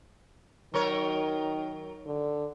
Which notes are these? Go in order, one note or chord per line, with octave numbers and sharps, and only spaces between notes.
D#3 F#3 A#4 C#5
D3